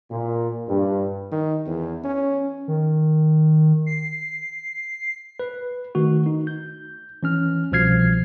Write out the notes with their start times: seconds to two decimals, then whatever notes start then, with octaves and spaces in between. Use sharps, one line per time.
0.10 A#2
0.69 G2
1.31 D#3
1.67 E2
2.04 C#4
2.68 D#3
3.86 C7
5.39 B4
5.95 D#3 A3 F#4
6.26 D#4
6.47 G6
7.23 E3 C#4 F6
7.72 C2 B2 F3 F6 G#6 C7